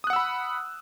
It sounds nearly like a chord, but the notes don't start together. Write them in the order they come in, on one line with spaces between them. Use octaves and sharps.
D#6 F#6 F#5 E6 B5